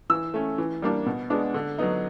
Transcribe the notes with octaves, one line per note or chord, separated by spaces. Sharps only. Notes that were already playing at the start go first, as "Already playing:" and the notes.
E3 E6
A3 C#4
E3
G3 A#3 D4
B2
G#3 B3 D4
D3
F#3 B3 D#4